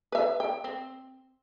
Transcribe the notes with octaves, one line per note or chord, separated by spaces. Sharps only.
B4 E5
G5
C4